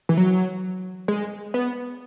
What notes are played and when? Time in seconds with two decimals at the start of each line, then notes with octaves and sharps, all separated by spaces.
0.09 E3
0.17 F#3
1.08 G#3
1.54 B3